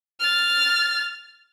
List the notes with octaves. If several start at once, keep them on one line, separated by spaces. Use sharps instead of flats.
F6 A6